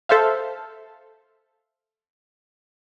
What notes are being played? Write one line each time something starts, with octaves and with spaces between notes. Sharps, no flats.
A4 C5 E5 F5